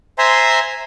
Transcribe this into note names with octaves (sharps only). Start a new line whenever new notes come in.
C5 E5 G#5 A#5 C6